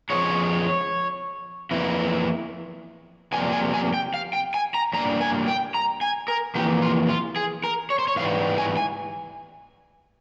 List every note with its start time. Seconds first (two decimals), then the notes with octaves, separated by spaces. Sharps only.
0.10 F2 C#3 F3 G#3 C#5
1.71 F2 E3 A#3 E4
3.32 F2 C3 G3 A#3 G#5
3.52 G#5
3.74 G#5
3.94 G5
4.14 F5
4.33 G5
4.54 G#5
4.74 A#5
4.93 G2 G3 A#3 A#5
5.21 G#5
5.48 G5
5.74 A#5
6.01 G#5
6.28 A#4
6.55 F2 E3 A#3 G4
6.82 F4
7.09 F4
7.36 G#4
7.64 A#4
7.90 C#5
7.99 C5
8.08 C#5
8.16 G#2 E3 G3 F5
8.58 G#5
8.77 G#5